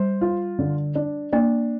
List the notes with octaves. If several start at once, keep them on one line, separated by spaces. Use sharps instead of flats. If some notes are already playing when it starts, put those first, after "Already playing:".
Already playing: G3 C5
F4
D3
D4
A#3 D4